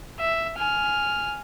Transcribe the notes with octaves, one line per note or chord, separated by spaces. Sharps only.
E5
G#5 F6